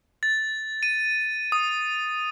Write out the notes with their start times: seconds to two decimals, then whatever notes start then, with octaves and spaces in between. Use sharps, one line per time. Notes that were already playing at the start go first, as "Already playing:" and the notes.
0.23 A6
0.83 D#7
1.52 D#6